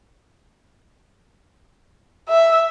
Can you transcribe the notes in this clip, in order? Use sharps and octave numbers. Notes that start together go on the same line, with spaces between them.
E5